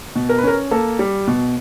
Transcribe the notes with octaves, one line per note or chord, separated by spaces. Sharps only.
B2
A#4
B4
C#4 A#4
A#3 A4
G3
B2